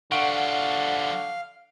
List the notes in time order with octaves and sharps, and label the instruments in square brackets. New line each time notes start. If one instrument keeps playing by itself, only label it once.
[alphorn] D3 [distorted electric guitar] F3 G3 [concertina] F5 [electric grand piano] F#5 C#6 D7